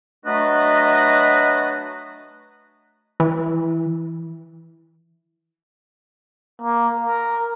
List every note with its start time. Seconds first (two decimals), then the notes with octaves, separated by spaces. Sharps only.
0.25 F#3 A3 D4 F#4 B4 D#5
3.20 E3
6.62 A#3
7.01 A#4